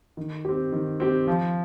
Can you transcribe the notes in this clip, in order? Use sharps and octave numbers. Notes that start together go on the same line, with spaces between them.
D#3
C4 G4
D#3
C4 G4
F3